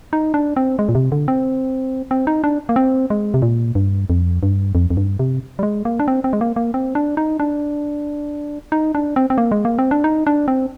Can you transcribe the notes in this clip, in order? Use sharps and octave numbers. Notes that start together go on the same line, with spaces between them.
D#4
D4
C4
G#3
A#2
C3
D3
C4
C4
D#4
D4
A#3
C4
G#3
C3
A#2
G2
F2
G2
F2
F2
G2
C3
G3
G#3
A#3
D4
C4
C4
G#3
A#3
A#3
C4
D4
D#4
D4
D#4
D4
C4
C4
A#3
G#3
A#3
C4
D4
D#4
D4
C4